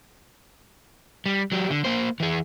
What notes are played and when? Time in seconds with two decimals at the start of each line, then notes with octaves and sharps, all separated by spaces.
1.26 G3
1.52 F#3 G4
1.70 D3
1.85 A#3 C5
2.20 E3 G#4